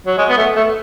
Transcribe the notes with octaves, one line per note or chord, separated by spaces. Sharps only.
F#3
G#3
B3
A3
A3